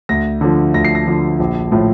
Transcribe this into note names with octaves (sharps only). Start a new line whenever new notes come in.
D2 A#6
D3 F3
D2 A#6
C7
A#6
D3 F3
A#1
A2 F3